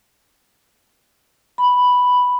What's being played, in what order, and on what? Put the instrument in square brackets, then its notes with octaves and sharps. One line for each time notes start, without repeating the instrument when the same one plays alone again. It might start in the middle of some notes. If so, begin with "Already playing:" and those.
[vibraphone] B5